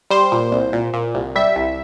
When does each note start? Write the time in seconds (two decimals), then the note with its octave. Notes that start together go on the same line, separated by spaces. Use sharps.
0.10 G3 C5
0.32 A#2
0.52 C2
0.73 A#2
0.94 A#2
1.14 C2
1.36 G3 E5
1.56 C2